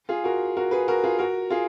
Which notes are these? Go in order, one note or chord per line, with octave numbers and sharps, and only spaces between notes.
F4 G#4
F#4 A#4
F#4 A#4
G#4 B4
F#4 A#4
F4 G#4
F#4 A#4
F4 G#4